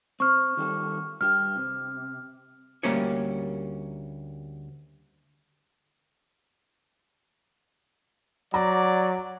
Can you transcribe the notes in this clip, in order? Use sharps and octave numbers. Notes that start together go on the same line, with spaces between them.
C4 C#6 F6
D#3 G3 A4
G2 G4 F6
C3
D2 G3 A#3 C#4 C#5
F#3 D5 A#5